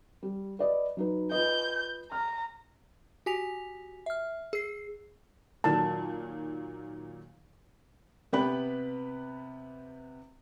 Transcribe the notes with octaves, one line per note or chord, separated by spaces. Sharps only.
G3
B4 D5 D#5
F#3 D#4 B4
F4 B4 D#5 G6
A#5 F6
F#4 G4 G#5 B6 F7
E5 F6
G#4 C7
A#2 D#3 F#3 A5
C3 B3 G4 B4 B5 F#6